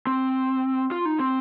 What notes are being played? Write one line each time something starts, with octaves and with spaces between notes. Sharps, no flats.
C4
F4
D#4
C4